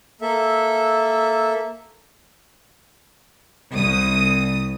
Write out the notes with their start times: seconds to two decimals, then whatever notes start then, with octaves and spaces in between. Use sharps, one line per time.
0.21 A#3 A4 E5
3.72 C2 D#6